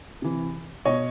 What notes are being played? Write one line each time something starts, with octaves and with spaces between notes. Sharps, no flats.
C3 E3
B2 C#5 D#5